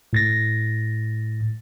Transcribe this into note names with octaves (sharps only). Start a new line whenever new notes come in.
A2 A6 A#6